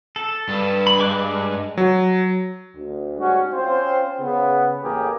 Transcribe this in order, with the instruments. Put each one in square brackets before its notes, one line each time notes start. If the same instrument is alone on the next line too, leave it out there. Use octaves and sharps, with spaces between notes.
[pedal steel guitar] A4
[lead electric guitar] G2
[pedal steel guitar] B5
G#3 D6 F#6
[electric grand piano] F#3
[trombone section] D2
G#2 G3 C#4 F#4
C4 C#4 F4 C5
C#3 B3
A1 A#3 G4 G#4 A#4